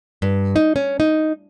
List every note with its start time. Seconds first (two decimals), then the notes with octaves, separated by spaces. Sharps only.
0.22 G2
0.56 D#4
0.76 C#4
1.00 D#4